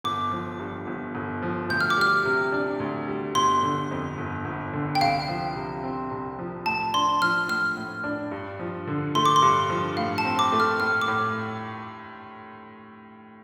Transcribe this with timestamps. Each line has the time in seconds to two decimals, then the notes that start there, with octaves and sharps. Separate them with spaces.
0.04 G1 D6
0.31 F3
0.60 G2
0.87 G1
1.15 G1
1.42 F3
1.69 D2 G6
1.81 F6
1.90 D6
1.98 G3 F6
2.25 C3
2.52 D4
2.80 D2
3.08 G3
3.35 G1 C6
3.63 D3
3.91 F2
4.18 G1
4.45 G1
4.73 D3
4.95 G5
5.01 C2 F5
5.28 F3
5.56 C3
5.83 C4
6.11 C2
6.39 F3
6.66 A2 A5
6.94 D4 C6
7.22 F3 F6
7.49 A2 F6
7.77 A2
8.04 D4
8.31 G2
8.60 F3
8.88 D3
9.15 A3 C6
9.25 D6
9.36 C6
9.42 G2
9.70 F3
9.97 A2 F5
10.18 A5
10.25 C4
10.39 D6
10.52 A3
10.60 F6
10.80 A2 F6
11.01 D6
11.08 A2